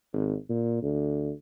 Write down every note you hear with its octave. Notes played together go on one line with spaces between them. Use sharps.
G#1
A#2
D2